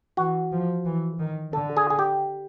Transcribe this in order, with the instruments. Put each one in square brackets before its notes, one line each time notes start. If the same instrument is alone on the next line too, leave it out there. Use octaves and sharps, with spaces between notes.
[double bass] E3 [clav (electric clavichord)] F#4
[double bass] F3
E3
D#3
[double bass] D3 [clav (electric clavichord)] A4
[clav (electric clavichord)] G#4
G#4
G4